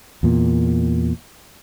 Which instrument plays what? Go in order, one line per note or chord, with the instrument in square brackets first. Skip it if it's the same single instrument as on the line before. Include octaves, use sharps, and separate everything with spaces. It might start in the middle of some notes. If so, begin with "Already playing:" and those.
[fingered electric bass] E2 A#2